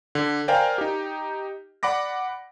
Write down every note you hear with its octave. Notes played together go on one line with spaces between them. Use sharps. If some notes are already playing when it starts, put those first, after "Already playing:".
D3
A#4 C5 D5 F5 G5 G#5
D#4 G4
D5 F#5 B5 D6 A#6